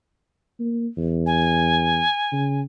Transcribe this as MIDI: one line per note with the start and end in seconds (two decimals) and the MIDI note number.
0.60 0.87 58
0.97 2.01 40
1.26 2.61 80
2.32 2.62 49